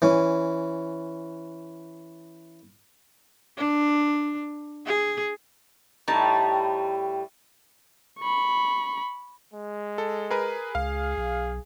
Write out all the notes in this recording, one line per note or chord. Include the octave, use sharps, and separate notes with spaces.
E3 C#4
D4
G#4
A2 G3 D#4 A5
B5 C#6
G#3
A4
G#4 A#4 B4
C#2 G#4 F5
B1